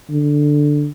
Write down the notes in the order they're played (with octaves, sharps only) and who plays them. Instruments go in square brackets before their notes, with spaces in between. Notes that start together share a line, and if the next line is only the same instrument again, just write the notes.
[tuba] D3